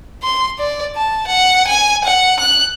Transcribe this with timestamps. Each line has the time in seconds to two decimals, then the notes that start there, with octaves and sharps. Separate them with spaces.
0.23 C6
0.59 D5
0.96 A5
1.27 F#5
1.68 G#5
2.04 F#5
2.40 F#6